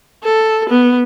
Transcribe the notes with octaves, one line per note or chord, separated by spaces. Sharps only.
A4
B3